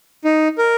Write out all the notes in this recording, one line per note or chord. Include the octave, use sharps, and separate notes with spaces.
D#4
A#4